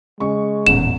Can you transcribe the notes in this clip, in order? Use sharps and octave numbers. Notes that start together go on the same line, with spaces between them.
C#3 G#3 C#6
D#1 A1 E2 E7